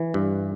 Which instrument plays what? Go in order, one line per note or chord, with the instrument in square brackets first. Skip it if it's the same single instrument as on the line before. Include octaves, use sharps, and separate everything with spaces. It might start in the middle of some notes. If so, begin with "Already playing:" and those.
Already playing: [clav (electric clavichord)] E3
G2